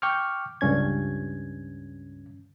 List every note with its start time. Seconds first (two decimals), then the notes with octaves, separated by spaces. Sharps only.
0.02 G5 C#6 D6 F6
0.61 C#2 G2 C#4 G#6